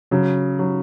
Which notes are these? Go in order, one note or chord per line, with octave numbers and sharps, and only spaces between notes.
C#3 F#3
F#3